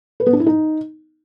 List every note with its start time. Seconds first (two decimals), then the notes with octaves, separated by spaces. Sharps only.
0.20 B4
0.27 B3
0.33 D4
0.40 E4
0.46 D#4